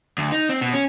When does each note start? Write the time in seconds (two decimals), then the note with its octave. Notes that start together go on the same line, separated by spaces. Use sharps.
0.18 D2
0.32 D#4
0.49 C4
0.62 B2
0.73 C#4